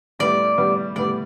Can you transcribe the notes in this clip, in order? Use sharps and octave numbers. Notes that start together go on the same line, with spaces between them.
A2 G3 B3 D5
A2 G3 B3
A2 G3 B3 D5